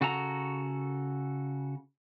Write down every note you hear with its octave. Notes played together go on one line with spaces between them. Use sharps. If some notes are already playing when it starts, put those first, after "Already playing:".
C#3 F#4 A4 A#5